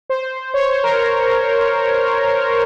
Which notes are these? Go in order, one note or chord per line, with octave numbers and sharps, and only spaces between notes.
C5
C#5
C5
A#4